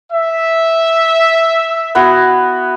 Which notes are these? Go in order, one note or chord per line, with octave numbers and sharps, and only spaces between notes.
E5
B3 E4 F#4